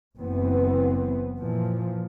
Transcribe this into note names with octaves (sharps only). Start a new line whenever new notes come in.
F#1 E3 B3 C4
A#2 E3 F3